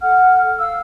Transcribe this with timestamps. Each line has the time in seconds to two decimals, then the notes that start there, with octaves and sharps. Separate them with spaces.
0.01 A4 F#5 F6
0.59 F5 E6